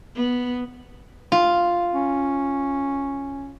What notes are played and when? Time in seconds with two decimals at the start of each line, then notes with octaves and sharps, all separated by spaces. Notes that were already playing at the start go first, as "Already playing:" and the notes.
0.15 B3
1.32 F4
1.93 C#4